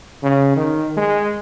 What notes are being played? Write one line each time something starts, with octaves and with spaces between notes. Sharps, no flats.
C#3
D#3
G#3